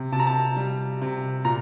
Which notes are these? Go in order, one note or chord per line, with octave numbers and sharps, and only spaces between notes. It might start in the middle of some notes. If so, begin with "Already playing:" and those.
Already playing: C3
C3 A5
A#5
A5
G3
C3
A#2 A#5